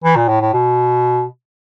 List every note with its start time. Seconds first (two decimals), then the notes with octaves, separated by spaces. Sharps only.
0.04 E3
0.16 A#2
0.28 A2
0.41 A2
0.53 B2